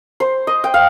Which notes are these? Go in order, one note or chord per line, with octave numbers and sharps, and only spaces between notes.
C5
D#5
G5
F5